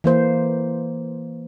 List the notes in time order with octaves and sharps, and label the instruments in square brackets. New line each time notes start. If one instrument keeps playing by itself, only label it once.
[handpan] E3 A#3 C5